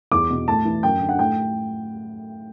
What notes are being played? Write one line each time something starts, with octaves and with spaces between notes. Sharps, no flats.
E2 D6
B2
A2 A5
E3
F#2 G5
D3
F#5
A2 G5